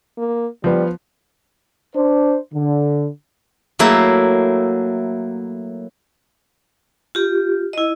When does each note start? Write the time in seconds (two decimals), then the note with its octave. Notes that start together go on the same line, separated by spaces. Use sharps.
0.18 A#3
0.64 F3 G3 B3
1.96 D4 C5
2.54 D3
3.79 F#3 A3 A#3 E4
7.15 F4 G4
7.73 E4 D#5